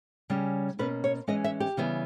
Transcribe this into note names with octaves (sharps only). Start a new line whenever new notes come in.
C#3 G3 C#4
B2 A#3 C#4 B4
C#5
E3 G#3 C#4 D#5
E5
G4
C#3 E3 G3 B3